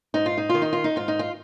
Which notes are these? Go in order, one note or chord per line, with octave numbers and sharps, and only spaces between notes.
G#2 D#4
F4
D#4
D#3 F4
D#4
F4
D#4
G#2 F4
D#4
F4